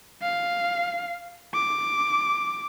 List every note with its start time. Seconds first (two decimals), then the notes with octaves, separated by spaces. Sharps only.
0.22 F5
1.54 D6